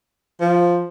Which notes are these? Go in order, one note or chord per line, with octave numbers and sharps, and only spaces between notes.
F3